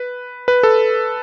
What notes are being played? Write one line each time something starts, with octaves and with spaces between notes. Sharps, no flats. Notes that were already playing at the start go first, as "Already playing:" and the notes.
Already playing: B4
B4
A4